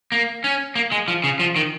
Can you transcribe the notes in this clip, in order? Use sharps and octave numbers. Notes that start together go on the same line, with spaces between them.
A#3
C#4
A#3
G#3
F3
C#3
F3
D#3